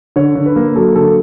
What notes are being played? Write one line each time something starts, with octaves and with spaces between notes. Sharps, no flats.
D3 C#5
D3
B4
A#3
F#3 A4
D3 A4